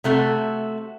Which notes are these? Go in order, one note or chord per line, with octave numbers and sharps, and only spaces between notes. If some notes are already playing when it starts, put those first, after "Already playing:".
C3 A3 F#4